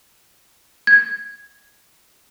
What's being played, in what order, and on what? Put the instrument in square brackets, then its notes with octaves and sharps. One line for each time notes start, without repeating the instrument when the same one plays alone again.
[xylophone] G#6